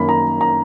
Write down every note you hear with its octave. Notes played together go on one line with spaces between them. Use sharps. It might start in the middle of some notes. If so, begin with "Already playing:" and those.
Already playing: F#2 D#3 A#3 C#4 B5
A#5
A#5